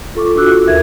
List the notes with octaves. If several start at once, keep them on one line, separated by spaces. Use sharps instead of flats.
F4 A4 C#6 D6
D4 F4 F#4 D6 E6 F#6
D#2 A#4 E5 G#6